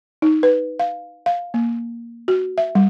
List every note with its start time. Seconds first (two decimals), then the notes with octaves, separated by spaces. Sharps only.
0.22 D#4
0.43 B4
0.80 F5
1.26 F5
1.54 A#3
2.28 F#4
2.58 E5
2.75 G3